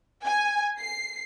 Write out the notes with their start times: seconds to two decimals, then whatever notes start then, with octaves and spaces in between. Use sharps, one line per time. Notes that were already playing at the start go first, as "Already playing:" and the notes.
0.25 G#5
0.79 C7